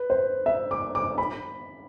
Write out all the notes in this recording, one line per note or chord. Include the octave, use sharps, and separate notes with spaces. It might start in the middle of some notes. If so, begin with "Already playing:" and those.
Already playing: B4
C5
E5
D6
D6
B5